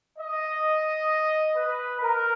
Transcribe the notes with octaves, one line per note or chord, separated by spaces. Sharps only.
D#5
B4
A#4